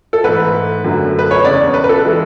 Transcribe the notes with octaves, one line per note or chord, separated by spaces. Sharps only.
A4
G#2 E3 A3 B4
F#2 D3 A3
B4
C#5
E2 C#3 G#3 D5
B4
B4
A4
E3 G#3